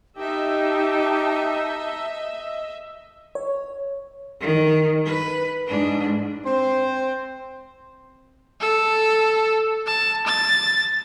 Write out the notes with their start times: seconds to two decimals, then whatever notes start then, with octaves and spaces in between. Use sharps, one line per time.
0.16 D#4 G4 D#5 E5 A5
3.35 C#5
4.41 D#3
5.05 B4
5.67 G#2 D4
6.45 C4 C5
8.61 A4
9.87 A5
10.27 A6